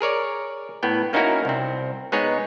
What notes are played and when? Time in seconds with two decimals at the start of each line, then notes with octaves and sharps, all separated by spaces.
0.01 G#4 A#4 C#5 D5
0.83 A2 B3 G5
1.13 A#3 C#4 D#4 E4 F#4 A#4
1.45 C2 C4
2.12 G#3 B3 D#4 G#4 C#5